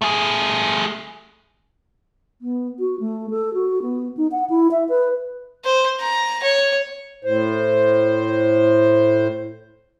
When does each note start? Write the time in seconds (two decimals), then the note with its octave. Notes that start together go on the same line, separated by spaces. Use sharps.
0.02 A3 G#4
2.42 B3
2.80 F#4
3.00 A3
3.30 A4
3.54 F#4
3.82 B3
4.17 D#4
4.32 F#5
4.50 E4
4.71 E5
4.89 B4
5.64 C5
6.00 A#5
6.43 C#5
7.25 A2 C5